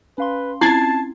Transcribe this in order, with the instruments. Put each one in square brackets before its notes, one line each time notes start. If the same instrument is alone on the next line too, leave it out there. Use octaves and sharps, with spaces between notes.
[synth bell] C#4 F5 C6 [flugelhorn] B4
[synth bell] C4 C#4 F4 [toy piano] E4 [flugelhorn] A5 [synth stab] G#6 A6 C7